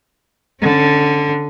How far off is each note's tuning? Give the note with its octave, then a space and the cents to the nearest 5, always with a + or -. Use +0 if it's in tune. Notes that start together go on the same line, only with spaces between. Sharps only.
D3 +0 C#4 -20